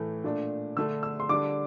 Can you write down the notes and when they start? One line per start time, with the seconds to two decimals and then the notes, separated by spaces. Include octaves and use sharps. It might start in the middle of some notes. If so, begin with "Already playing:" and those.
Already playing: A2 E3 A3
0.24 A#2 A3 D4
0.76 D3 A3 D4 E6
1.03 E6
1.20 C6
1.29 D3 G3 D4 D6